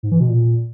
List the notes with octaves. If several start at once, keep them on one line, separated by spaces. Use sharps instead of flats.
G#2
E3
B2
A#2